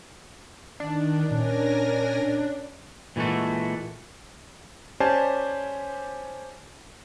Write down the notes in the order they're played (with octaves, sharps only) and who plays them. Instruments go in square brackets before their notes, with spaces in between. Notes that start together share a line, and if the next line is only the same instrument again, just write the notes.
[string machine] D#3 [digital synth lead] D4
[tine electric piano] A#2 [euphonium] C#4 [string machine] A#4 G#5 A#6
[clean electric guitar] A#2 E3 G#3 A3 F#4
[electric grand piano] C#4 G4 C5 D5 G#5 A5